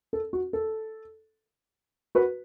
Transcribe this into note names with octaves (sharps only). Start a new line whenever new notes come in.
A4
F#4
A4
F#4 B4